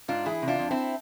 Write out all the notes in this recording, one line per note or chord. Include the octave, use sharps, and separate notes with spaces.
G#2 D4 F4
E3 E4 G#4
C3
D4 F4
F2
C4 E4